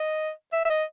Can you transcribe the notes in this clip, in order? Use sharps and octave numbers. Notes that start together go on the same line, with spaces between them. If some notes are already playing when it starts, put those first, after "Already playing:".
Already playing: D#5
E5
E5
D#5